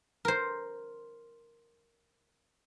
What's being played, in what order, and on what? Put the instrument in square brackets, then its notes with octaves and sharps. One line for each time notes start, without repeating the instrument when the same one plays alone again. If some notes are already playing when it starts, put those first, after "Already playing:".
[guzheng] A#4 C5